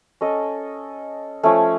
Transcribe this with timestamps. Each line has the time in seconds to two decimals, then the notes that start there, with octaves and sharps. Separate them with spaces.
0.21 C#4 A4 D#5
1.43 F3 A3 C#4